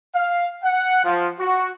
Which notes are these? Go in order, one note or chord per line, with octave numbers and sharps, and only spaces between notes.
F5
F#5
F3
F#4